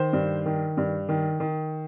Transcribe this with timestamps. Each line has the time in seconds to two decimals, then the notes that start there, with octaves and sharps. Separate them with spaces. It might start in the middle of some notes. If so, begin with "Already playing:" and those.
Already playing: D#3 C5
0.13 G2
0.46 D#3
0.77 G2
1.09 D#3
1.40 D#3